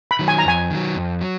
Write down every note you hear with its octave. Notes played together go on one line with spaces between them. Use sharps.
B5
D#3 F#3
G#5
A#5
F2 G#5
D#3 F#3
F2
F#3